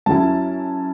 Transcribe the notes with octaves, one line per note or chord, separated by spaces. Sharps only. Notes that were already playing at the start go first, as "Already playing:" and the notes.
F#2 F#3 C#4 E4 A5